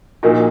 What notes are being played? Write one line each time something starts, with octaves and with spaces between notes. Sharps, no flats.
A#1 A#2 A#3 D#4 F#4